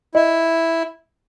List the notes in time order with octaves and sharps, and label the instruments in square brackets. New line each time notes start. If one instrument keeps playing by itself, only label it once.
[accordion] E4 [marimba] D#5